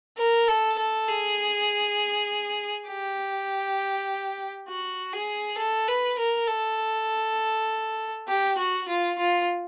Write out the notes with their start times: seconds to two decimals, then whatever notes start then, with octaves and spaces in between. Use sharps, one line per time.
0.17 A#4
0.48 A4
0.78 A4
1.08 G#4
2.88 G4
4.68 F#4
5.12 G#4
5.58 A4
5.87 B4
6.18 A#4
6.48 A4
8.28 G4
8.57 F#4
8.88 F4
9.18 F4